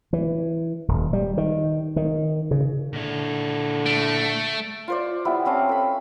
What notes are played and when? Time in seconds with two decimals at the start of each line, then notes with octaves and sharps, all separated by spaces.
0.13 E3
0.88 D#1
1.13 G3
1.37 D#3
1.96 D#3
2.51 C#3
2.93 A#2 D3 E4
3.86 A3 D7
4.88 F4 C5 D5
5.25 G3 B3 E4
5.45 C4 C#4 F5 A5
5.69 A4 B5